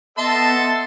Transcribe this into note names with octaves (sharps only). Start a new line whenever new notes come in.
B3 A4 D#5 E5 A5 C6